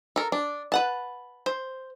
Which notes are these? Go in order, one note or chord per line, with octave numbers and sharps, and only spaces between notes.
A4 A#4
D4
B4 F#5 A5
C5